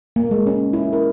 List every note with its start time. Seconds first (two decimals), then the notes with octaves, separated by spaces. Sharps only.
0.16 A#3
0.31 G#3
0.47 C#4
0.73 E4
0.93 A#4